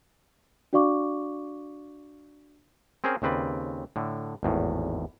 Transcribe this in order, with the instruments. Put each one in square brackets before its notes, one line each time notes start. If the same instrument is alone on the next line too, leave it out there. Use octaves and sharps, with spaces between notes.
[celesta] D4 F#4 D5 F5 C#6 D6
[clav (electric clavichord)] C4 C#4 G#4 A#4 C5
D#2 C#3 C4 B4 D5
A2 D3
G#1 E2 A2